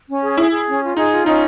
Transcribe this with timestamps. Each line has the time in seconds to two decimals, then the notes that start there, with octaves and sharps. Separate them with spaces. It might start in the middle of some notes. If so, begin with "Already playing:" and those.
0.08 C#4
0.23 G#4
0.37 E4 G#4
0.52 G#4
0.68 C#4
0.82 F4
0.97 D#4 G#4
1.12 F4
1.26 C#4 D#4